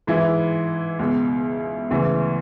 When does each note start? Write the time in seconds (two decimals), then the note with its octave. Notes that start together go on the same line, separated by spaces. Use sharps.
0.07 G#2 E3 E4
0.99 C#2 B2
1.90 D2 C#3 E3